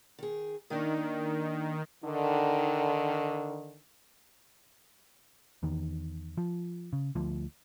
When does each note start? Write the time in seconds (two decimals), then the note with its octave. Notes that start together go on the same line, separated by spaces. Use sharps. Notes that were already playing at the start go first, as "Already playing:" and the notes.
0.18 D#3 G#4
0.70 D#3 A#3 D4
2.05 D3 D#3
5.63 E2 D#3
6.38 F3
6.93 C#3
7.15 D2 F3